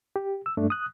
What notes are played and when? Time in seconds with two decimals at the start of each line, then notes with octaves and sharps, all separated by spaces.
0.16 G4
0.46 E6
0.57 G2 A3 D4
0.70 D#6 F#6